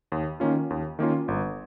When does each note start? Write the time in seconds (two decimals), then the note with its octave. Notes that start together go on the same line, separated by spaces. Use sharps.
0.12 D#2
0.40 D#3 A#3 C#4 F4
0.70 D#2
0.99 D#3 A#3 C#4 F4
1.28 G1